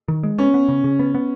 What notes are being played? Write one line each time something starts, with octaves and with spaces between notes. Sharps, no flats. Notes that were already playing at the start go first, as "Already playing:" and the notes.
D#3
G#3
B3 C#4
B3
C#3
C#3
B3
B3